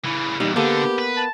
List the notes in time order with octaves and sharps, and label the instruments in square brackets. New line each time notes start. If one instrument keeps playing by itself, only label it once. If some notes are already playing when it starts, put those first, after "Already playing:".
[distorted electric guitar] C#3 E3 [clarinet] E4
[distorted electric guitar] E2 A#2 [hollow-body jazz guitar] G3 D#4
[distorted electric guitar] D3 [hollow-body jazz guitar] A#3 B3 A4 [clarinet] G4
[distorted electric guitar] B4
[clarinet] A5